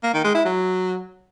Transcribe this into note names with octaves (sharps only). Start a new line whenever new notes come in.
A#3
D#3
G#3
E4
F#3